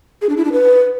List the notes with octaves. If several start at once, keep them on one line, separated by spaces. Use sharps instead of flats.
G#4
D4
E4
D4
B4